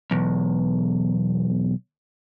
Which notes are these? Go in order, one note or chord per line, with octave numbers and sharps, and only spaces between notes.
B1 E2